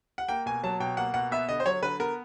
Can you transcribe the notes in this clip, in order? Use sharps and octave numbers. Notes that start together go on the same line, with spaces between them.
F#5
A#3 G5
B2 G#5
F#3 A5
B2 G5
A#3 F#5
B2 F#5
B3 E5
D3 D#5
C5
F#3 C#5
D3 B4
B3 A#4